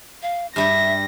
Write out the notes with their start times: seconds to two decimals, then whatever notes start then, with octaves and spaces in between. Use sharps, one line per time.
0.23 F5
0.56 G2 G3 G4 E5 A#6